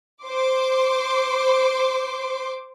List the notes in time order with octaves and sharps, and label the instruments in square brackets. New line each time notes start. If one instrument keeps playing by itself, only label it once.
[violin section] C5 C6 D6